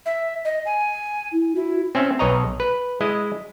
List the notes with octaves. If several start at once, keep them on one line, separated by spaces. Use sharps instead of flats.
E5
D#5
G#5
E4
E4 F#4
C4 C#4 E5
B1 B4 C#5 D#5 A#5
B4
G#3 E4 D#5